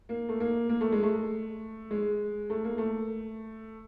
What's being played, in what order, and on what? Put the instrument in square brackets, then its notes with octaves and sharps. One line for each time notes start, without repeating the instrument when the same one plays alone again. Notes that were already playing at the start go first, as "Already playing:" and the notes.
[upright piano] A#3
A3
A#3
A#3
A3
G#3
A3
G#3
A3
A#3
A3